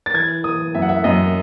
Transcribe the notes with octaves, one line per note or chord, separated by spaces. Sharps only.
A6
E3 G#6
E3 D#6
F#2 E5
F#5
E5
F#2 D#5